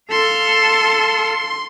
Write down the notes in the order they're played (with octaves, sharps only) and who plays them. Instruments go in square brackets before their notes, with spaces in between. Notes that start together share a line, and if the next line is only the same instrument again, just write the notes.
[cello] A4 F5 [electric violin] C6